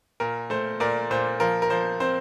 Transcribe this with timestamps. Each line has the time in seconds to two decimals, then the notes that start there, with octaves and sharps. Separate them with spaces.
0.20 A#2 A#4
0.50 A3 C5
0.80 A#2 A#4 D5
1.11 A#2 C5
1.40 F3 A#4
1.62 A#4
1.70 F3 C5
2.00 C4 C5